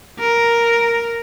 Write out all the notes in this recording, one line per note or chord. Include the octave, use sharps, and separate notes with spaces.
A#4